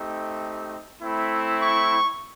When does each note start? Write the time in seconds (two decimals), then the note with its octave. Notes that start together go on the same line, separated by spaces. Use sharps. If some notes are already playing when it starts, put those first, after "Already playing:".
Already playing: A3 C4 D#4 G4
1.01 A3 C4 E4
1.62 C#6